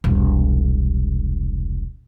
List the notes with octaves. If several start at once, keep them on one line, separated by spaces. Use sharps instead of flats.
E1 C2